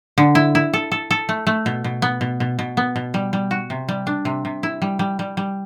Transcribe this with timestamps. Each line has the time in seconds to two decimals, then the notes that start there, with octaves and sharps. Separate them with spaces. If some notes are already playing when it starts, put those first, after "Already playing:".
0.18 D3
0.35 E4
0.55 E4
0.73 A4
0.92 A4
1.11 A4
1.29 A3
1.47 A3
1.66 B2
1.84 B2
2.02 B3
2.21 B2
2.40 B2
2.59 B2
2.77 B3
2.96 B2
3.14 G3
3.33 G3
3.51 F#4
3.70 C3
3.89 G3
4.07 D4
4.25 C3
4.45 C3
4.63 E4
4.82 G3
4.99 G3
5.19 G3
5.37 G3